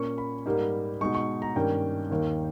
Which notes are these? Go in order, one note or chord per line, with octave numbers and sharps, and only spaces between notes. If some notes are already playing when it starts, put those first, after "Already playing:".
Already playing: A#2 A#3 C#4 C#6
B5
G#2 G3 A#3 D#4
B2 G#3 D#4 C#6
C#6
A#5
G2 D#3 A#3 C#4 G5
D#2 D#3 A#3 D#4